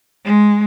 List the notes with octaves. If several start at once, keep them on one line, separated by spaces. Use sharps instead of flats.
G#3